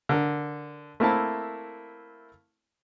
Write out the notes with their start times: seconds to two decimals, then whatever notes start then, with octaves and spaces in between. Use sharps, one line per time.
0.09 D3 A#4
1.00 A3 A#3 C4 E4 A5